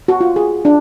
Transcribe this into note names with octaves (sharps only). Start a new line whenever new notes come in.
F#4
F4
G#4
D4